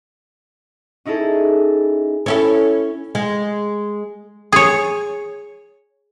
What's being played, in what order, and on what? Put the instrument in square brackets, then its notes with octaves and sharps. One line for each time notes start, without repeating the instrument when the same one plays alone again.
[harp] C#4 D#4 E4 G#4 A4
[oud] C#4 E4 A4
G#3
[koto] G#4 C#5